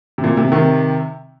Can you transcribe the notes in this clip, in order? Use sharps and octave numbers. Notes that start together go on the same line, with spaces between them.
C3
A#2
C3
C3 D#3